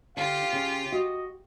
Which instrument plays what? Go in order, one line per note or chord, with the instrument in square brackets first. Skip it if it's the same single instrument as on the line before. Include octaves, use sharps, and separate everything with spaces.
[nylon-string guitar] D3 [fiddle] F4 G4 [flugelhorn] F5
[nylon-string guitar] C#3 C#4
[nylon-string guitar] F#4 [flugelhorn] D#5